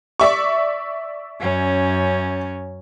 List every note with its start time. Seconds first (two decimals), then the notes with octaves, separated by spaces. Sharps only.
0.20 D5 E5 C#6
1.37 F#2 C#4